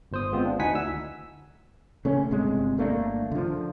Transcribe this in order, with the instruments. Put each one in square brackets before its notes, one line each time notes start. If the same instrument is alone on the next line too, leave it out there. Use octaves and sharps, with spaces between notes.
[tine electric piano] G1 C5 D#6
G#3 B3 C4 F4
D4
D2 D#4 E4 F#5 G#5 B6
D2 E6
[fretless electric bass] C#3 A3 C#4
G1 C3 G#3
G1 A3 A#3 D4
D3 F3